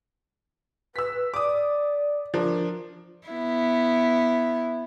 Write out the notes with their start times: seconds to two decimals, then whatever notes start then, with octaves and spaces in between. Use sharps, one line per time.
0.96 B4 E6 B6
1.34 D5 D6 D#6
2.34 F3 D4 A#4
3.28 B3 E4